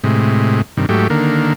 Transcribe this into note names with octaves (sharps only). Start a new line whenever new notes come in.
A2 C3 G#3
G2 C3 D#3
G#2 F#3 A3 G4
D3 D#3 A#3